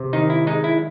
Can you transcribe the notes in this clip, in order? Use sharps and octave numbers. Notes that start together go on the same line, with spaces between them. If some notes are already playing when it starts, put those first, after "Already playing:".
Already playing: C3
D#3 D#4
E4
G#3 D#4
E4